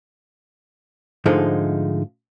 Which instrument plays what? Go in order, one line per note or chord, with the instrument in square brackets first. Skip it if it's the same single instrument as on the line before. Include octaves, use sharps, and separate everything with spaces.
[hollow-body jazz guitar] G#2 D3 F3 G#3 A3 D#4